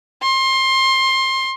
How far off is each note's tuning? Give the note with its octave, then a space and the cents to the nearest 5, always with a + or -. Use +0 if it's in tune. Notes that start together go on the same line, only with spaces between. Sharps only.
C6 +25